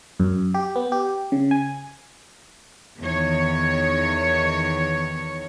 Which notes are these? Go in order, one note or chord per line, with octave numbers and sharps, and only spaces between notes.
F#2
G4
B3
G4
C#3
G#5
E2 D#3 C#5